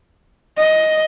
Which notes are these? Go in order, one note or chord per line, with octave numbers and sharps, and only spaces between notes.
D#5